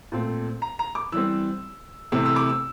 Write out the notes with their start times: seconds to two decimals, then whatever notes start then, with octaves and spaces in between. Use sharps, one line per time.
0.12 A#2 A3 C4
0.62 A#5
0.79 A#5
0.95 D6
1.12 E3 G3 C4 E6
2.12 C3 E3 A3 C4 E6
2.26 E6
2.36 D6
2.49 E6